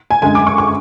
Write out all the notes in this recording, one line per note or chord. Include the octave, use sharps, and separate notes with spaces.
G#5
F#2 D3 G#3 G#5
D6
C#6
C#6